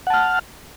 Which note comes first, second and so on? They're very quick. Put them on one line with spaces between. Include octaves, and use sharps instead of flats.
F#5 A5 F6